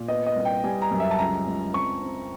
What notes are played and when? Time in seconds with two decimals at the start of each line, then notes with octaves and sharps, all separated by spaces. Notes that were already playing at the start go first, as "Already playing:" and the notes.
Already playing: A#2 A#3
0.08 B3 D#5
0.27 D#5
0.35 C2
0.45 G5
0.64 G3 G#5
0.82 A#5
0.91 F#2
1.00 E5
1.11 A5
1.19 C#2 A#5
1.47 C#2
1.74 C4 C#6
2.02 C4